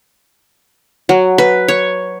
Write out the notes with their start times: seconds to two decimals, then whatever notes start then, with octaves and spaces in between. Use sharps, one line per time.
1.09 F#3
1.38 B4
1.68 C#5